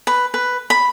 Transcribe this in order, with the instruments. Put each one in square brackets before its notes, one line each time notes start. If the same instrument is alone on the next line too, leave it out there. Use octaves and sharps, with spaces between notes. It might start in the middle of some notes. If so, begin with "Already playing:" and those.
[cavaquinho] B4
B4
B5